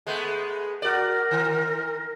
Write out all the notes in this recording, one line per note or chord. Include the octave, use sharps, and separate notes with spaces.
G#3 A3 B3
F#4 A#4 D5
D#3